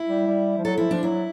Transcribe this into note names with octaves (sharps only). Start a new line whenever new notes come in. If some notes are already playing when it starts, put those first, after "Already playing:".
Already playing: E4
G3
G3
F3
F#3 A4
F3 E4
F3 D4
F#3 E4